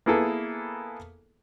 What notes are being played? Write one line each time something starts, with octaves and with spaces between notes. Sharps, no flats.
A#3 B3 E4 G#4 A4